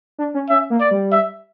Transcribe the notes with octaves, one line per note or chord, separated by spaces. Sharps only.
D4
C#4
C#4 E5
A#3
D5
G3
E5